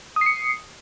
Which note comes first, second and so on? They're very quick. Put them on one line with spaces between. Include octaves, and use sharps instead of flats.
D#6 C7 C#7